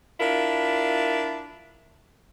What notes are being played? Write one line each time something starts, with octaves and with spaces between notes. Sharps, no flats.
D4 E4 F4 A#4